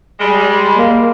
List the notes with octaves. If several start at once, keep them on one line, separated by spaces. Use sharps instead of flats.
G3 G#3
A#3